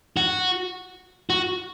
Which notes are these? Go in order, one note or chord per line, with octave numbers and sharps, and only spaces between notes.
F#4
F#4